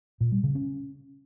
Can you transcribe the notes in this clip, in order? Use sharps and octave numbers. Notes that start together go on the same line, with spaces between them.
A#2
G3
C#3
C#4